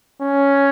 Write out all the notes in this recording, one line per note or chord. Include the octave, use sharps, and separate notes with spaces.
C#4